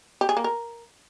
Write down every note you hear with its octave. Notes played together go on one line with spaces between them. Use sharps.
G4
G#4
A#3
A#4